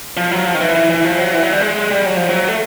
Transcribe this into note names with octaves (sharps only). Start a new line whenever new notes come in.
F3
F#3
F3
D#3
E3
E3
E3
F3
F#3
E3
F#3
G3
G#3
G3
F#3
F3
F#3
A3